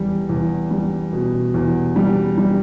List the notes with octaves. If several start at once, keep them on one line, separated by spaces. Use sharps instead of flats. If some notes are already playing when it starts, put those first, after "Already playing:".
Already playing: E2 G3
E2
G3
B2
E2
G3
G3